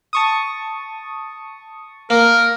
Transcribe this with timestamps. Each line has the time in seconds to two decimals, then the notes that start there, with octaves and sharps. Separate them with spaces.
0.13 A5 C#6 D#6
2.10 A#3 A#4